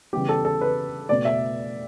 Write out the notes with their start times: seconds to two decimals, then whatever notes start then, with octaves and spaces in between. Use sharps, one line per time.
0.13 C#3 E3 G3 B3 G4
0.29 A4
0.45 A4
0.61 B4
1.09 B2 A3 D5
1.25 E5